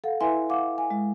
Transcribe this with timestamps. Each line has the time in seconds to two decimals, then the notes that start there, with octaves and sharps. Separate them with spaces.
0.04 A4 F5 F#5
0.21 E4 B4 E5 G#5 C6
0.50 F5 F#5 D6
0.78 G#5
0.91 G#3